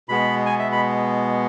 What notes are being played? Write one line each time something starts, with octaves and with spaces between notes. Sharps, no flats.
B2 G#3 B3 B5
G#5
E5
B5